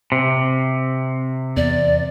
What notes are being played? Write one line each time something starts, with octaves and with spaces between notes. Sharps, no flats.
C3
E2 D5